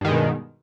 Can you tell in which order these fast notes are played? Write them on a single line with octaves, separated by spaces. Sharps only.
G2 D#3 G#3 B2